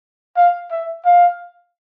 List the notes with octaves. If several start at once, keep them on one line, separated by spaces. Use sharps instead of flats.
F5
E5
F5